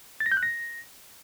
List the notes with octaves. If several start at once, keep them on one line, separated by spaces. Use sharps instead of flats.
A6
A#6
G6
F#6
A#6